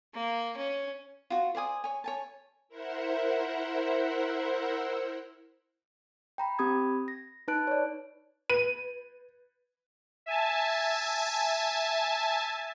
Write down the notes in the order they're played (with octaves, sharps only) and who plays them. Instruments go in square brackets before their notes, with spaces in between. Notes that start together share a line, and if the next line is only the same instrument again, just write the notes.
[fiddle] A#3
C#4
[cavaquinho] F4 F#4
C5 D5 G#5 D#6
C#5 G#5
C#5 G#5 A5
[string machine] E4 A#4 C5 E5 F#5
[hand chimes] G5 A#5 B5
C4 G4 B5 D#6 G#6
A#6
D#4 B4 A5 F#6 D7
C#5 D5
[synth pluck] B4 [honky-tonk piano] D#7
[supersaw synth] E5 G#5 A5